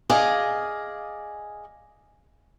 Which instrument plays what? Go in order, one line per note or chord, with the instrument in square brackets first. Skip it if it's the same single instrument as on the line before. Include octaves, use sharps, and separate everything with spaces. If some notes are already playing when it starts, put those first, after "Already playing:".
[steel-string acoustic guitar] G#4 D5 D#5 F5 G#5